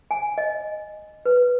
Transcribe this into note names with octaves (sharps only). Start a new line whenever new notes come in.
G#5
D#5
B4